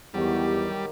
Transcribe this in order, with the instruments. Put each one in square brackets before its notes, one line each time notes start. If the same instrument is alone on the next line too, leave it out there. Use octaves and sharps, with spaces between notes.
[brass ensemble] E2 [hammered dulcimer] D#3 F#3 [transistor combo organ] G3 [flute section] G4